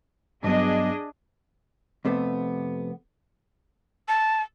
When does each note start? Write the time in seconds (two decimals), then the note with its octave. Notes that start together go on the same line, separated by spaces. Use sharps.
0.44 G2 F#3 B3 D4 G#4 D#5
2.05 F2 C3 A3 B3
4.08 A5